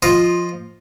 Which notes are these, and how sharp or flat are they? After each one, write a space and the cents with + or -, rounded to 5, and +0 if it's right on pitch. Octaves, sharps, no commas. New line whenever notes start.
F3 +0 F4 +5 D#5 +0